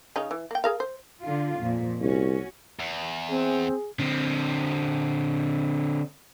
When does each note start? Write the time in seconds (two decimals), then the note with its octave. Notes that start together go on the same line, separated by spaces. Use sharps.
0.16 C#3 C#4 D#4
0.31 E3
0.51 A#3 G5
0.64 G#4 A#4 F5
0.80 C5
1.22 D3 D4 F4
1.57 F2 A#2
2.01 C2 C#4 F#4
2.79 E2
3.29 C4 G#4
3.99 D3 C4